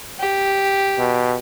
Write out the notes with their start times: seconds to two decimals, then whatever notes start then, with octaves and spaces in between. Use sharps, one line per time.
0.20 G4
0.99 B2